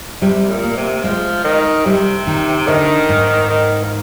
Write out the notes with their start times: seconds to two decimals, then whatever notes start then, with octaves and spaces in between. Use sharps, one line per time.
0.22 C3 G3
0.49 A#2
0.64 A#3
0.77 C3
1.04 F3 G#3
1.45 D#3
1.86 C3 G3
2.27 D#3
2.68 D3 D#3
3.09 G#2
3.50 D#3
3.84 A#3